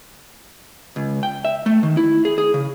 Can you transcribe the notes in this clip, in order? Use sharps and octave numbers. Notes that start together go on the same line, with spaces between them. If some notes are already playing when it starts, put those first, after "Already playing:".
C#2
G5
E5
A3
D#3
E4
G#4
G#4
C#3